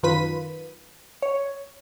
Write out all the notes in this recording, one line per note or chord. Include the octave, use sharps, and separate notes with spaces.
F#2 D#3 F4 B4 B6 D#7
C#5